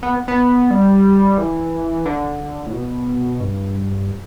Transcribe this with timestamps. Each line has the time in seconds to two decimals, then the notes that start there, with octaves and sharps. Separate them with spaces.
0.03 B3
0.28 B3
0.71 G3
1.38 E3
2.06 D3
2.67 A2
2.73 B2
3.40 G2